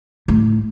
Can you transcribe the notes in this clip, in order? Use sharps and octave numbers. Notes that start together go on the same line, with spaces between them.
A2